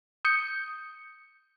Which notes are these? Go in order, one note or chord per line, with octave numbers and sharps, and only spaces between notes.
D#6 G6 C#7